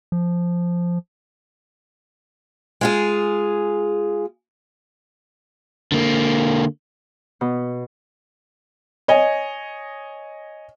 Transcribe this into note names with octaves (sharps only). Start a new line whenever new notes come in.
F3
G#3 F4 G#4
D3 A#3
B2
C#5 D#5 G#5